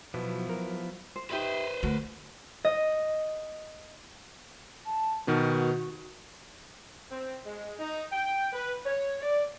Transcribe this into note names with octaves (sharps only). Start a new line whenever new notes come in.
B2 F3 F#3 B3 E4
A#4
C5
D#4 G4 B4 C5 E5
D2 F#4 A#4
D#5
A5
B2 D#3 B3 F#4
C4
G#3
D#4
G5
B4
C#5
D5